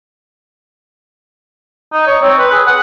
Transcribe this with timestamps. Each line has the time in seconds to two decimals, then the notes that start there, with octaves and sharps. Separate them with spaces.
1.93 D#4
2.07 C#5
2.22 C4
2.38 B4
2.52 G#4
2.67 F#5